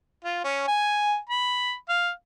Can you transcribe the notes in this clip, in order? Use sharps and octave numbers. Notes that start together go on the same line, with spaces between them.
F4
C#4
G#5
B5
F5